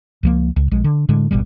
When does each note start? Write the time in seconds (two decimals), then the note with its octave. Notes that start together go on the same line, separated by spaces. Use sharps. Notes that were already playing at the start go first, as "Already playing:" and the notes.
0.23 C#2 F3 A#3
0.56 C#2
0.71 A#1 G#3
0.84 D3
1.09 A2 D3 G#3
1.31 D1 G#1 B2 G3